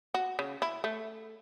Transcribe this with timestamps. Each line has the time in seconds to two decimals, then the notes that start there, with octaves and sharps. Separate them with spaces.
0.14 F#4
0.39 C#3
0.62 E4
0.84 A3